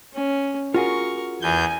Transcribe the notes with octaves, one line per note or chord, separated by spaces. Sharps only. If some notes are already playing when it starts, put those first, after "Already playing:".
C#4
F4 F#4 G#4 A#4 C#6
E2 G#5 G6